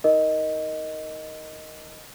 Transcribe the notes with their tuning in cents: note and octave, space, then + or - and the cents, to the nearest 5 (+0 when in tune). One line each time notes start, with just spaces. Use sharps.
D#4 +25 A#4 +0 D#5 +0